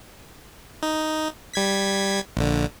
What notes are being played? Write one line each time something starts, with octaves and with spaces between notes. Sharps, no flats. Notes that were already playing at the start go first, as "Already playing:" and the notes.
D#4
G3 G#6 B6
A#1 D3